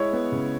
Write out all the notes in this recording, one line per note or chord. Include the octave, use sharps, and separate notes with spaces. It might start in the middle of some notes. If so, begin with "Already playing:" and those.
Already playing: G#3 E4 C#5
B3
C#3